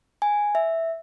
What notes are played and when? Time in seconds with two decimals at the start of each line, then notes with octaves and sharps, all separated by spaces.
0.22 G#5
0.55 E5